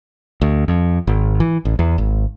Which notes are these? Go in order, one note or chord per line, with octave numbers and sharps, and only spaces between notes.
D2
F2
G#1
E3
A1
E2
G#1